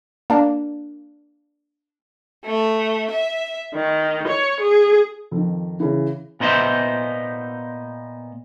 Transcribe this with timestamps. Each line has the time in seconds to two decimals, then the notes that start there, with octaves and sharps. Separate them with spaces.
0.30 A#3 D4
2.45 A3
3.11 E5
3.74 D#3
4.26 C#5
4.59 G#4
5.31 F2 D#3
5.80 C#3 E3
6.40 A#2 B3 D#4 C5 E5